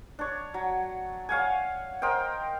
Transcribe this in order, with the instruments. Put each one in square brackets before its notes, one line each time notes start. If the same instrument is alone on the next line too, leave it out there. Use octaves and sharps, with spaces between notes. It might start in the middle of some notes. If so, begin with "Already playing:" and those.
[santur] D4 C#5
F#3
C#5 F5 F#5 G#5
A#4 C5 D#5 G5